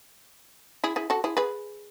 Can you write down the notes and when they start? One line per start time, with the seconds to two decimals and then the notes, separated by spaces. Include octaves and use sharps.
0.84 E4 G#4
0.96 E4 G#4
1.10 F#4 A4
1.24 E4 G#4
1.37 G#4 B4